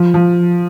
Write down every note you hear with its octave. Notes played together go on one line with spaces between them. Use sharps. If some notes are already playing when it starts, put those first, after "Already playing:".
Already playing: F3
F3